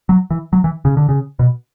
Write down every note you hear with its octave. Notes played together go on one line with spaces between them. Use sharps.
F#3
E3
F#3
E3
C#3
D3
C#3
B2